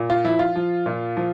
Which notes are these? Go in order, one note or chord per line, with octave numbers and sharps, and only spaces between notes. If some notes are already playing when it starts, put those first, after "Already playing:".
Already playing: A#2
F4
F3 E4
F4
F3
A#2
F3